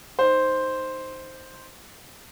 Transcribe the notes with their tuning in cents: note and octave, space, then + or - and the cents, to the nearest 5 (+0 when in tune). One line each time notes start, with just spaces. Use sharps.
D#4 +0 C5 +0